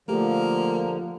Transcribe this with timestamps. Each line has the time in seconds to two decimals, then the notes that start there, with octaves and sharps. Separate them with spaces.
0.08 D3 F3 A3 A#3 G4 A#4